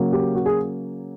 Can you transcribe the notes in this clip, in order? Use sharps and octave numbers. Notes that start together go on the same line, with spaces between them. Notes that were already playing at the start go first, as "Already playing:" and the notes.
Already playing: C#3 F#3 A#3
G4
F#4
G#4